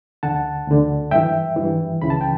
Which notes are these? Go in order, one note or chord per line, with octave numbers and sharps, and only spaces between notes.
D2 D3 F#5 A5
D2 D3
G2 E3 E5 G5
G2 E3
C#2 C#3 E3 B5
A5
G5